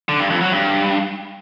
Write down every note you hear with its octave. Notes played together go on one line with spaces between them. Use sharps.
D3
G2
F2
F#3
G2